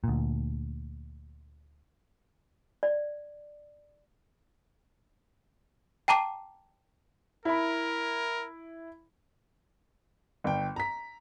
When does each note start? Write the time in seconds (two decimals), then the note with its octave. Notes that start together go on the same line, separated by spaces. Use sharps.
0.04 D2 A#2
2.83 D5
6.08 G5 A5 A#5 D6 C7
7.45 E4 A#4 B5
10.44 G1 G5
10.76 A#5 B6